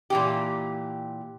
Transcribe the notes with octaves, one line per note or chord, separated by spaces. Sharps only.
A#2 E3 G4